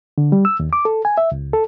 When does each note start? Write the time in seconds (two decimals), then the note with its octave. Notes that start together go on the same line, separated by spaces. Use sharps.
0.18 D3
0.32 G3
0.45 E6
0.60 D#2
0.73 D6
0.85 A4
1.05 G#5
1.18 E5
1.32 C#2
1.53 A4